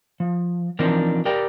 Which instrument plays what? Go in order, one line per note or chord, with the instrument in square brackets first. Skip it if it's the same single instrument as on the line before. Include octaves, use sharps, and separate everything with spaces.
[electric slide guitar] F3
E3 F3 C4 D4 D#4 A#4
G4 A#4 D5 G5